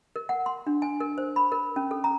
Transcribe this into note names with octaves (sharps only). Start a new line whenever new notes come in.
A#4
F#5
C6
D4
G#5
A#4
C5
B5
A#4
C#4
A4
A#5